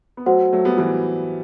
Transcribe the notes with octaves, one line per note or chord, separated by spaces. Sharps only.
B3
F#3 A3 F#4 C5 F#5
F#3 A3
G3 B3
E3 G3